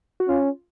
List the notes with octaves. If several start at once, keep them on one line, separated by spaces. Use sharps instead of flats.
F#4
C#4 F4